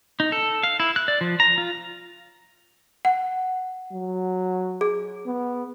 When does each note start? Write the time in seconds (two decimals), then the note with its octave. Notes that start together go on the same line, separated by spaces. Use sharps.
0.20 D#4
0.32 A4
0.63 F5
0.80 E4
0.96 F#6
1.08 D5
1.21 F3
1.40 A#5
1.58 F4
3.05 F#5
3.92 F#3
4.81 G#4
5.26 B3